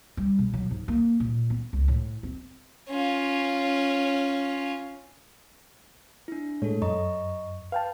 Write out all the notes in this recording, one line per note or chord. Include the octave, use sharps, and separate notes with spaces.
G3
B2
F#3
G#2
A#3
A#2
B3
C#2
A2
C4
C#4 F4
D4 E4
A2 G#3 A4 C#5
F#2 D#5 A#5 C#6
B4 F5 G5 A5